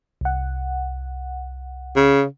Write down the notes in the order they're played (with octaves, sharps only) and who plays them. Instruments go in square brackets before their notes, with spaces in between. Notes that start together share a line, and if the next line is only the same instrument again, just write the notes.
[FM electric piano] C2 F#5
[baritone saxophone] C#3